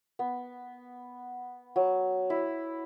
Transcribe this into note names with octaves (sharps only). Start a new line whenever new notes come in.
B3
F#3
E4